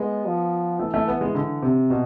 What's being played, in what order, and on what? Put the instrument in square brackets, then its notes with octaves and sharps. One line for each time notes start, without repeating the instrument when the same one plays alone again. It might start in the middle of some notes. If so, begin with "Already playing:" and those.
Already playing: [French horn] G#3 [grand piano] B3
[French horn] F3
[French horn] E3 [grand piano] A3
[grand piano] A3
B3
G#3
D3
C3
B2